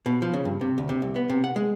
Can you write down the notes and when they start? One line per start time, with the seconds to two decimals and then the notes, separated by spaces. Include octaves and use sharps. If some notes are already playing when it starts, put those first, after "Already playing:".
0.06 B2
0.22 F3
0.34 C#3
0.45 G2
0.61 C3
0.78 D2
0.89 C3
1.02 C2
1.16 B3
1.30 C3
1.44 F#5
1.56 G#3